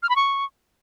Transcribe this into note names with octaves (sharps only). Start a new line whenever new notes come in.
F6
B5
C#6